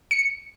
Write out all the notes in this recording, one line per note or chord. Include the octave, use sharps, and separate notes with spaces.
C#7